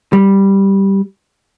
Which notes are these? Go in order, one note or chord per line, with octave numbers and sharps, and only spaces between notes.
G3